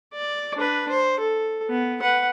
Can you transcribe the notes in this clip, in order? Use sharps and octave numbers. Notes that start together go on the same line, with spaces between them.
D5
D4 B4
C5
A4
B3
B4 F#5